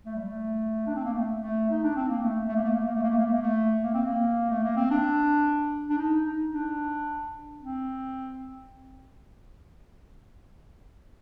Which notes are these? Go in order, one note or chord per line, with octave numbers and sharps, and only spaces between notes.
A3
G3
A3
D4
C4
A#3
A3
A3
D#4
D4
C4
A#3
A3
A3
A#3
A3
A#3
A3
A#3
A3
A#3
A3
A#3
A3
A#3
A3
A#3
C4
A#3
A3
A#3
C4
D4
D4
D#4
D#4
D4
C4